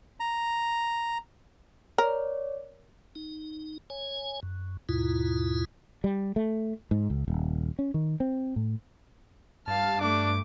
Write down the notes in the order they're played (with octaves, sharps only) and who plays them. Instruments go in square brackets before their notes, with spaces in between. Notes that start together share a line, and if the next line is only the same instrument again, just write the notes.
[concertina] A#5
[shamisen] A#4 [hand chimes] C#5 D5
[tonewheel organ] D#4
C#5 G#5
F#2
D#2 G#2 B2 E4 F4
[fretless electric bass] G3
A3
G#2
C#2
D#1
C#4
D#3
C4
A2
[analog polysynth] G2 [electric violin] F5 F6 [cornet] A5
[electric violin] A3 D6 [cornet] D4